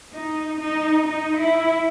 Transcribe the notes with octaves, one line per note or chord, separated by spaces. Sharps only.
D#4
D#4
D#4
E4